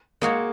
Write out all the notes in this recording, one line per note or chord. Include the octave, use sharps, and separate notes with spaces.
G#3 A#3 D#4 F#4 C#5